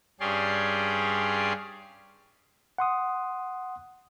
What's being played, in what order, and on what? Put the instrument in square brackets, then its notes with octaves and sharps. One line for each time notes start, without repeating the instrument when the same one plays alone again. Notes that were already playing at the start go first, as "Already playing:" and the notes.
[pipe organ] G2 C#4 G4 G#4 D5 C6
[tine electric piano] F#5 C6 D#6